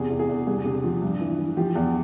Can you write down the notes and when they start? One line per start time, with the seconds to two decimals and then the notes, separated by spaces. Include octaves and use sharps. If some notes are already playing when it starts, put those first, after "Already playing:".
Already playing: E2 C3 G#4
0.10 E2
0.19 G#4
0.29 E2
0.47 C2 G#4
0.65 C3
0.84 F3
1.02 G2
1.21 E3
1.38 E3
1.57 F3 G4
1.75 E2